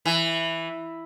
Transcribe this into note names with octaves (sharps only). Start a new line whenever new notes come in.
E3